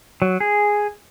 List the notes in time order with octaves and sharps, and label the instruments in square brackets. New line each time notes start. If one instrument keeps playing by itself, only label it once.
[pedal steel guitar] F#3
G#4